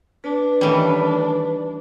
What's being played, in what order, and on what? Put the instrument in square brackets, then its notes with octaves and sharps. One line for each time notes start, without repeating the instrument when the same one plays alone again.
[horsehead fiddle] D4 [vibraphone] B4
[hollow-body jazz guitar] D#3 A3 C#4 [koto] E3 G3